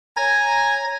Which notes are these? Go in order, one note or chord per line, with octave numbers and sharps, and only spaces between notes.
C#5 G#5 A#5 G#6